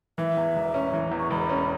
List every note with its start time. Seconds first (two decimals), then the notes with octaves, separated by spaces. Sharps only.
0.18 E3 E5
0.37 E2
0.56 E1
0.74 C#4
0.93 E3
1.12 E2
1.19 C#6
1.30 E1 B5
1.49 C#4